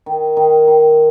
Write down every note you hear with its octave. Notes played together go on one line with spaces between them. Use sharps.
D#3
D#3
D#3